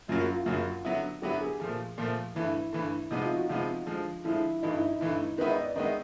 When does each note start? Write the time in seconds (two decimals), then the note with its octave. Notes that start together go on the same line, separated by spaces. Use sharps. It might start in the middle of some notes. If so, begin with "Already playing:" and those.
0.08 F#2 C#3 F#3 A#3 F4
0.21 F#4
0.34 F4
0.46 F#2 C#3 F#3 A#3 F#4
0.85 D3 F#3 B3 E4
1.22 D3 F#3 B3 E4 G4
1.41 G#4
1.60 A#2 F3 A3
1.98 A#2 F3 A3
2.35 G2 E3 A3 E4
2.73 G2 E3 A3
3.11 C3 F3 G#3 B3 D#4
3.24 F4
3.36 F#4
3.49 C3 F3 G#3 B3 F4
3.86 D3 F3 G#3
4.24 D3 F3 G#3 E4
4.62 G2 E3 A3 D#4
4.75 E4
4.88 E4
5.01 G2 E3 A3
5.38 D#3 G#3 B3 E4 B4
5.51 D#5
5.63 D5
5.76 D#3 G#3 B3 E4 D#5